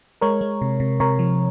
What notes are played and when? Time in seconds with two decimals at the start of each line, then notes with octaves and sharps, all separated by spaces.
0.21 G#3 A#4 C#5
0.41 G#3
0.62 C3
0.80 C3
1.00 C3 A#4 C#5
1.19 F3